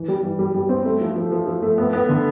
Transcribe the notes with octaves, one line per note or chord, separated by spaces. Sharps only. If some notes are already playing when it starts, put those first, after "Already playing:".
Already playing: E3
G3
E3
G3
G3
C4
A3
F3
F3
F3
F3
A3
B3
B3
D3